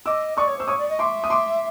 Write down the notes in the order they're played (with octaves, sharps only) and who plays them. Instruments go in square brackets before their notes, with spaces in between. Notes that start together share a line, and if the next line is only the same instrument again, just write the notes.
[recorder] D#5 [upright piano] D6 E6
[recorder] D5 [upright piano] C#6 D#6
[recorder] C#5
[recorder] C5 [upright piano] E6
[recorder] C#5 [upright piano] C#6 D#6
[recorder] D5
D#5
[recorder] E5 [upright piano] C6 D6
[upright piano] D#6
C6 D6